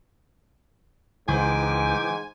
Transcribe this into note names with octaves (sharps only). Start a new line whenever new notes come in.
C#2 G#2 E3 G5 G#5 D6